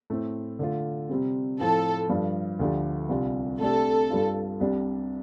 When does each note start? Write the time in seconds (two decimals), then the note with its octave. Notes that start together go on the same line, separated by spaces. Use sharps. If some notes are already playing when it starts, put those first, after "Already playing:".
0.10 A2 A3 C4
0.59 D3 A3 F4
1.09 C3 G3 C4
1.60 A2 F3 C4 A4
2.09 G2 F3 D4 G4
2.59 D2 D3 F3 D4 G4
3.09 C2 C3 G3 D4 F4
3.60 C3 A3 D4 G4 A4
4.10 G2 G3 D4 F4
4.60 C2 C3 G3 D4 G4